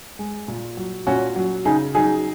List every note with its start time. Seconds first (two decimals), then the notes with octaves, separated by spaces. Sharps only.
0.19 G#3
0.48 A#2
0.77 F#3
1.07 A#2 C#4 F#4
1.36 F#3
1.65 C#3 D#4 G#4
1.95 F#3 D#4 G#4